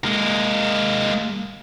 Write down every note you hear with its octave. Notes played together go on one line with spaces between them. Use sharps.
G#3 A#3